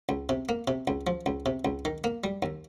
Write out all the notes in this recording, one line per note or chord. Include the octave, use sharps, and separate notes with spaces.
C#2
C3
A#3
C3
C#2
F3
C#2
C3
C#2
D#3
A#3
G3
D#2